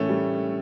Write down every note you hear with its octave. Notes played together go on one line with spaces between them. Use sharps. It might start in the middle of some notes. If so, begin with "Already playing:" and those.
Already playing: A2 E3 A3 C#4
G3